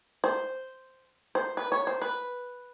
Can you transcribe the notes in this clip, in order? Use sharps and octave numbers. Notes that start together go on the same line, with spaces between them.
C5
C5
B4
C#5
C5
B4